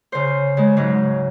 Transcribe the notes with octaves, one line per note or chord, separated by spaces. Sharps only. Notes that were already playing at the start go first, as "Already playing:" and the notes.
C#3 C5
C#3 G#3
G#2 C#3 F#3